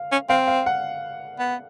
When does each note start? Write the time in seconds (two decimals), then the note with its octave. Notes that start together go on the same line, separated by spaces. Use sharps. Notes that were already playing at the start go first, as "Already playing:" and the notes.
Already playing: F5
0.12 C#4
0.29 C4 F5
0.48 F5
0.66 F#5
1.39 B3